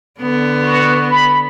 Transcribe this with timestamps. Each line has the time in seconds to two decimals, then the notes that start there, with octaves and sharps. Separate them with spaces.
0.21 D3 B3
0.62 F#4
1.11 B5